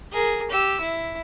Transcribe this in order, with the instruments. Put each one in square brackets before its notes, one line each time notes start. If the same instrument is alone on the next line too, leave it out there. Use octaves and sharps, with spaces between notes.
[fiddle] G#4 A#4
G4 E6
E4